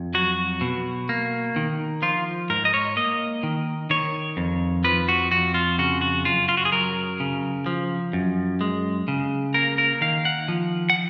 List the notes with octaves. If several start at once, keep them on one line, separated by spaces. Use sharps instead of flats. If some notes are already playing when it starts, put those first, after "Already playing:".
Already playing: F2
F#3 F#4
B2
A#3
D#3
F3 F4
G#2 A#4
D#5
C#5
A#3 D#5
D#3
D#3 C#5
F2
F3 B4
F#4
F2 F#4
F4
C#3 F#4
F#4
F#2 F4
F4
F#4
G#4
F#3 A#4
C#3
F3
F#2
G#3
C#3
A#3 A#4
A#4
D#3 F5
F#5
F3
F#5